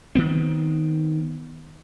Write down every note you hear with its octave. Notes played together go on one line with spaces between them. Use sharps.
D#3 B3 C4